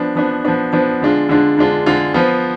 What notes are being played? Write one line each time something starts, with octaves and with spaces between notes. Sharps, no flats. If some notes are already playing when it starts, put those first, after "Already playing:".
Already playing: F3 B3 D4
F3 B3 D4
F3 B3 D4
F3 B3 D4
D3 G#3 D4 F4
D3 G#3 D4 F4
D3 G#3 D4 F4
D3 G#3 D4 F4
F3 B3 F4